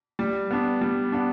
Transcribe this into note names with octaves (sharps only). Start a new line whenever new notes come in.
G3
B3 D4
G3
B3 D4